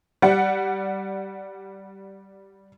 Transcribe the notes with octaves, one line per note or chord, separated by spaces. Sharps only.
G3 F#5